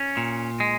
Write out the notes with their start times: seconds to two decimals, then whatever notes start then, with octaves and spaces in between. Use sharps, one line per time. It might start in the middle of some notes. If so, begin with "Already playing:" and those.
Already playing: C#4
0.17 A#2
0.60 G#3